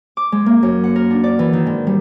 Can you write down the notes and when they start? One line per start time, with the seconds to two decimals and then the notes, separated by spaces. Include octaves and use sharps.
0.17 D6
0.32 G#3
0.46 A#3
0.63 F#2
0.84 F#5
0.96 A#4
1.11 D4
1.24 D5
1.39 E3
1.53 D#3
1.67 G#2
1.87 G3